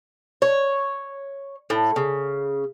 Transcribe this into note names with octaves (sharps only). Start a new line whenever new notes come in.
C#5
A2
C#3